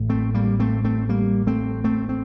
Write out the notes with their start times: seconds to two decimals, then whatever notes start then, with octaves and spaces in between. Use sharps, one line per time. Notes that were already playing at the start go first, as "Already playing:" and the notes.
Already playing: A1 A2
0.10 A3 C4
0.34 G3 A#3
0.60 A3 C4
0.85 A3 C4
1.09 G3 A#3
1.47 A3 C4
1.84 A3 C4
2.09 C4